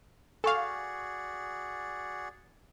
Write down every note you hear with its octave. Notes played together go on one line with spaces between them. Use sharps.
F#4 G#4 A4 D5 F5 G#5 C#6